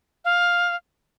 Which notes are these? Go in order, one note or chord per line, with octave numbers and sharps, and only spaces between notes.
F5